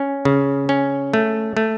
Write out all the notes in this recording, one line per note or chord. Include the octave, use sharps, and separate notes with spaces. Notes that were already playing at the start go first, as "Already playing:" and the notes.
Already playing: C#4
C#3
C#4
A3
A3